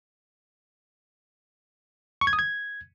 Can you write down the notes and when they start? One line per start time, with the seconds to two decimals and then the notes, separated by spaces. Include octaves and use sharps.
2.21 C#6
2.27 G#6
2.33 D#6
2.39 G#6